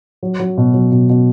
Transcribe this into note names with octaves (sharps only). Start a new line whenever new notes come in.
F#3
F#3
B2
F#3
B2
B2